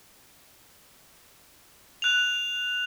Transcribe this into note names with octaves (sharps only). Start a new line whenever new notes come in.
F#6 F7